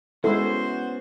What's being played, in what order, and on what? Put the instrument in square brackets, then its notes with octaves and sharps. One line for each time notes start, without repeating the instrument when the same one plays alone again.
[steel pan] G#3 E4 [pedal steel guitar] B3 C#4 [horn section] F#4 C5 [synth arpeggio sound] A4